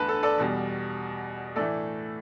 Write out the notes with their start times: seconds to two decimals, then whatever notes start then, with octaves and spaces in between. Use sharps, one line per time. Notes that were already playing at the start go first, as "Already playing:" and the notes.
Already playing: E2 D3 A3 B4 A5
0.08 A4
0.23 A4 D5
0.38 E2 B2 G3
1.56 A2 E3 A3 A4 D5